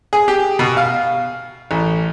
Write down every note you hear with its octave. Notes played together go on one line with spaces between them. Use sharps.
G#4
G4
B2
F5
A1